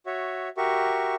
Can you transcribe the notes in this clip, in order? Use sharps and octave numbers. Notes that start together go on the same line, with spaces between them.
F#4 C#5 E5
F#4 G4 A#4 E5 C#6